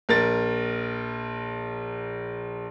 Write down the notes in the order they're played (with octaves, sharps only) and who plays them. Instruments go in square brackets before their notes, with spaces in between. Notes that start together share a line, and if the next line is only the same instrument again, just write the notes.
[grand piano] A#1 A#4 A6